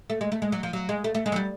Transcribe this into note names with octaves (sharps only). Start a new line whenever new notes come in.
A3
G#3
A3
G#3
F#3
F3
F#3
G#3
A3
A3
G#3
F#3
G3